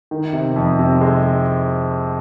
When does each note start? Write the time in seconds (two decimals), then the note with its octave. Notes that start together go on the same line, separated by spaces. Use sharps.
0.11 D#3
0.33 C3
0.56 F2
0.79 C3
1.01 G#3